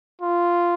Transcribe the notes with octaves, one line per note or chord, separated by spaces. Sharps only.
F4